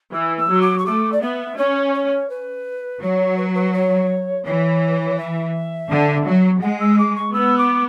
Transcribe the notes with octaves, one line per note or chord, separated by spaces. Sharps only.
E3 E6
E6
F#3
D6
C#6
A3 D6
D5
B3 E5
C#4 C#5
C#5
B4
F#3 C#5
B4
B4
C#5
E3 C#5
E5
D3
F#3
G#3 F#5
E6
D6
C#6
B3 E6
D6